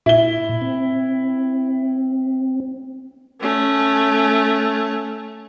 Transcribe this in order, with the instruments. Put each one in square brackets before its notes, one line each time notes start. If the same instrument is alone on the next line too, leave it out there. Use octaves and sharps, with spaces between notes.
[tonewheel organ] A#2 [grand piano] E4 G7
[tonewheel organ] C4
[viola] A3 C#4